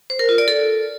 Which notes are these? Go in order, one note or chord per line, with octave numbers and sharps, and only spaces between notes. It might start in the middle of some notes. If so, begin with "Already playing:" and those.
C5
A#4
F4
D5
A4